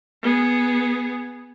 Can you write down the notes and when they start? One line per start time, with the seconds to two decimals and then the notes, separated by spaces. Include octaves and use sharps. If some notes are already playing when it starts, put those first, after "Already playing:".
0.22 B3 G#4